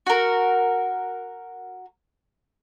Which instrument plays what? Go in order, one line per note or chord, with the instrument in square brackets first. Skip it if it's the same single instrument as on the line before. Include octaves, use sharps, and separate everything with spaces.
[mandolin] F#4 A#4